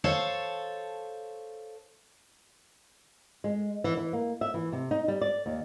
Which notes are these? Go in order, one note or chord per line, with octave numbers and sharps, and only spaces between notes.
A4 C5 C#5 F5 A5
G#3
E3
E3
A#3
E5
E3
C3
D#4
G3
D5
D#2